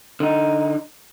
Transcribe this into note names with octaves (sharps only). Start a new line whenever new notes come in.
D3 D#4